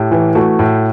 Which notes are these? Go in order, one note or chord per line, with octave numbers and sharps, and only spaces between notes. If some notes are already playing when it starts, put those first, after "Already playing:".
Already playing: A2 G4
E3
A3 F#4
A2